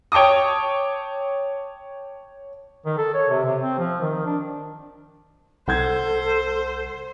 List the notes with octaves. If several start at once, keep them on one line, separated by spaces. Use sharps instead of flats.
C#5 G5 A5 D6 D#6
D#3
A4
C#5
C3
C3
C4
F3
D#3
D4
C2 A4 C5 F#5 G6 G#6